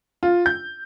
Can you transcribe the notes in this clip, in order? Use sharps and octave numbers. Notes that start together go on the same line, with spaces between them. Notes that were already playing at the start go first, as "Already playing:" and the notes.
F4
G6